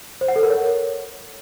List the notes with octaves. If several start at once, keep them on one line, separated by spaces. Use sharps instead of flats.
C5
F#5
A4
A#4
C#5